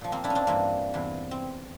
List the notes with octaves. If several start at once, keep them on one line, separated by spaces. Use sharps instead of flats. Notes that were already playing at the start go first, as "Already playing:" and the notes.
A#2 F3
A#3 C4
D4 E4
C#4
C4 D4
G2 E3 A#3 C4
E2 C3 E3
C4